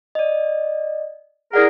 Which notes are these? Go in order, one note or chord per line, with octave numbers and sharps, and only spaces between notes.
D5 D#5
E4 G#4 A#4 D5 F#5